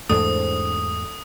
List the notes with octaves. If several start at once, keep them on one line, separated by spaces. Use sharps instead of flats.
E2 G#2 A3 C4 D4 A4 D#6